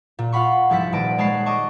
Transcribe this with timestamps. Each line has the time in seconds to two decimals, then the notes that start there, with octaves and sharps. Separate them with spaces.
0.19 A#2
0.32 F4 F5 F#5 B5 C#6
0.70 C2 G#2 F3 A4 F#5 B6
0.93 D#1 B4 D5 A5 A#6 D7
1.18 G#3 C#5 A5 B5 F#6 C7
1.46 D#5 A5 C#6 D6